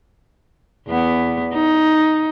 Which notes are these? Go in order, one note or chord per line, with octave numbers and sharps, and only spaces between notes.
E2 B3
D#4